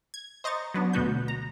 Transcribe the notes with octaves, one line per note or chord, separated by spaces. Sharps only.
G#6
C5 D#5 A#5 C#6 A6
F#3 B3 D4
D2 B2 B3 F#4 G6
A#5